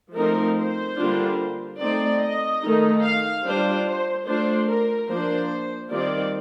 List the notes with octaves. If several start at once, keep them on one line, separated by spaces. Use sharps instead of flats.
F3 A3 C4 D#4 A#4
C5
D3 G3 A#3 D4 F4
A3 C4 D#4 D5
D#5
D#3 A3 D#4
F5
G3 D4 F4 C5
C5
A3 D4 F4 C5
A#4
F3 A#3 D4 C5
D#3 G3 C4 F4 D5